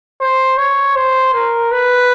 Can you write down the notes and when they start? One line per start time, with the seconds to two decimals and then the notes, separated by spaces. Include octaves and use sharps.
0.21 C5
0.58 C#5
0.96 C5
1.34 A#4
1.72 B4